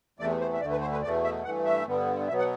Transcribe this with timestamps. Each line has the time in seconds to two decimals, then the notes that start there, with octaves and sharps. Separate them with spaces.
0.19 E2 C3 E3 A3 D5
0.41 C5
0.53 E5
0.61 D2 D3 A3 D5
0.71 B4
0.81 C5
0.92 B4
1.03 E2 B2 A3 D5
1.24 E5
1.44 G2 E3 A3 F#5
1.66 E5
1.86 G2 D3 G3 B3
2.28 B2 F#3 B3 E5
2.39 F#5